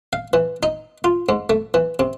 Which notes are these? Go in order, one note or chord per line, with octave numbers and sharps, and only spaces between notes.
F5
E3
D#4
F4
G#2
A3
E3
C3